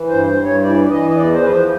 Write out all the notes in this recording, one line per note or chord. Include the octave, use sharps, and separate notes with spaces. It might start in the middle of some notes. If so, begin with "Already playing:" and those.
Already playing: E3
G2 C5
C5
G2
C#5
E3 D5
D5
E3 D#5
D#5
E2 D5
C5
F3 B4
C5